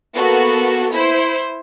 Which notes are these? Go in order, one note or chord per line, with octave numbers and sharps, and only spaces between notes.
A#3 B3 F#4 A4
E4 C5